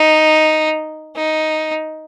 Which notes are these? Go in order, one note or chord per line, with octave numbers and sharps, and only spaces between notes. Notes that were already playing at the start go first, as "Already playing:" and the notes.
Already playing: D#4
D#4